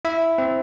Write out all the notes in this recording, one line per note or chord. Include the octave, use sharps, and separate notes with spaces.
E4 E5
C4